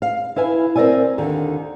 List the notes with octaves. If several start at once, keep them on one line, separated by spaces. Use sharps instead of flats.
F5
E4 B4 F5 G#5
C4 A#4 C5 D5 E5 G#5
D#2 D3 D#3